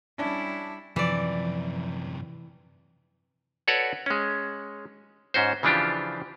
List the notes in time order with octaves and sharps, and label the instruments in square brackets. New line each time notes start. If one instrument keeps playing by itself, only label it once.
[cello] G3 E4 [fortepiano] C#4 D4
[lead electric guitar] F#2 C3 [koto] E3 D5 [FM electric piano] F3
[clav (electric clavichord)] F#4 A4 B4 C#5 D5 F#5
G#3 C#4
G#2 C#4 F#4 C5
C#3 E3 F3 D4 F4 G4